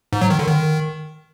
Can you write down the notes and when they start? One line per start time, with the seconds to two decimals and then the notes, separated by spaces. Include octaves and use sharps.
0.13 G#2
0.21 F#3
0.30 D#3
0.39 D3
0.48 D#3